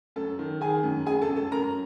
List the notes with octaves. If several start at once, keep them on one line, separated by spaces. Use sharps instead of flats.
F#2 A4 A5
D#3
D#3 G#4 G#5
F#2
F#2 G#4 G#5
A4 A5
F#2
A4 A5
F#2 A#4 A#5